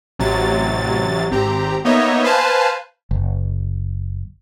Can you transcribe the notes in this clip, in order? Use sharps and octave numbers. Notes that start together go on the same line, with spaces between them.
A1 C3 F#3 A6
G#1 C4 G4 A#5
A#3 B3 D#4 C#5 D#5 E5
B4 C5 F5 G#5 A5
F#1